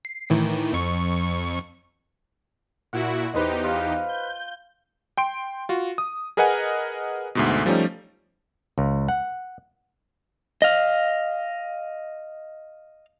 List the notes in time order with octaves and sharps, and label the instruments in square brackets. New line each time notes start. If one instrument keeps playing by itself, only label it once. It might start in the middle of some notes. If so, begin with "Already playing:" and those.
[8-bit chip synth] C7
A2 D#3 E3
F2 C#6
[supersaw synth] A#2 E4 F#4 [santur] F#5
[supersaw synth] E2 D#4 G4 [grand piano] B4 C5 D#5
[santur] F4 F5
[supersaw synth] G6
[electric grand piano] G5 C6 D7
F4 F#4
D#6
G#4 A#4 B4 D#5 F#5 G#5
D2 G#2 B2
F3 G3 A3 C#4 D#4
[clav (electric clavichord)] C#2
F#5
[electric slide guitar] D#5 F5